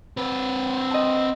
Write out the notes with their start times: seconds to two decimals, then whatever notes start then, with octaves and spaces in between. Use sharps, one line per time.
0.17 C4 B4
0.91 D#5 A5